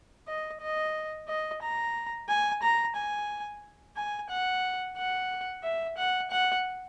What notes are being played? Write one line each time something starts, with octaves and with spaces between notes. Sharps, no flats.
D#5
D#5
D#5
A#5
G#5
A#5
G#5
G#5
F#5
F#5
E5
F#5
F#5